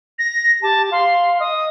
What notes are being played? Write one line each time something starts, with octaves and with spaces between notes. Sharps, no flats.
A#6
G4 A5
F5 C6
D#5 D#6